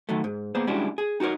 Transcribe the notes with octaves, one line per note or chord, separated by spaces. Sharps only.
D#3 F#3 A3
G#2
A#3 B3 G#4 C5
G3 G#3 C#4 D4 E4 F#4
G#4
D#4 F#4 G4 A#4 C#5